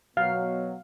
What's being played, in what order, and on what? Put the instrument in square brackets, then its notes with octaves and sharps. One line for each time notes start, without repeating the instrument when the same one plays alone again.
[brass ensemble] B2 F#3 [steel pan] F5